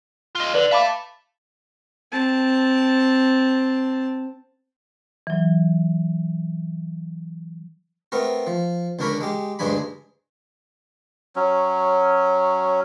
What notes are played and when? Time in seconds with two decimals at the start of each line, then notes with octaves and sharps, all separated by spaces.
0.35 F4 D#5
0.54 D3 B4 D5
0.71 E5 F5 A5 B5 D6
2.12 C4 A5
5.27 E3 F#3
8.12 A3 B3 C4 A#4
8.47 F3
8.99 C#2 D3 D4 A#4 C#5 B5
9.21 G#3 G4
9.59 D2 G2 G#3 D4 G#5 B5
11.36 F#3 C#4